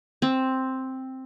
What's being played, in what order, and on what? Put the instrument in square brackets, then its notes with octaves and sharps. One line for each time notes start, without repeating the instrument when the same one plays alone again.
[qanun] C4